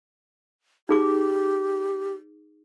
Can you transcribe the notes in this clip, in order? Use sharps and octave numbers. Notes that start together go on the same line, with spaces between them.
D#4 G4 G#4 D6